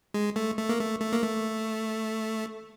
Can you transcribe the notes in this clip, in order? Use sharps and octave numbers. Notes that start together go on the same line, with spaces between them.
G#3
A3
A3
A#3
A3
A3
A#3
A3